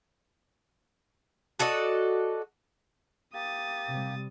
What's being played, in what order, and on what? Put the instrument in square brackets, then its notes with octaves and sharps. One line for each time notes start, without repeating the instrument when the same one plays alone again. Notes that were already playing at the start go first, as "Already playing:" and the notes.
[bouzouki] F#4 A4 D5 D#5
[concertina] A#3 G4 [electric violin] D#6 A6
[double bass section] C3 G3